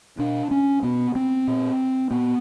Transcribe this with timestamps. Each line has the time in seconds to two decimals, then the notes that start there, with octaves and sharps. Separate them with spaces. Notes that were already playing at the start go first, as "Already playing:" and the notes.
0.19 B2 D4
0.51 C#4
0.83 B2 B3
1.15 C4
1.47 A#2
2.11 A#2 B3